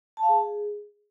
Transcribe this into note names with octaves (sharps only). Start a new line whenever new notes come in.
A5
F5
G#4